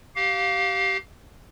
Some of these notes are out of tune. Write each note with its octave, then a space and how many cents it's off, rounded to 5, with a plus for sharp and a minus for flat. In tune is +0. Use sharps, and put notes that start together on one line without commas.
G4 -25 F5 +15